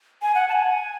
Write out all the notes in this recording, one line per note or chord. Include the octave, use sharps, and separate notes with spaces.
G#5
F#5
A5
G#5